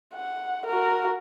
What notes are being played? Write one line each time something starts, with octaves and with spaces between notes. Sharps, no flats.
F#5
F#4 A#4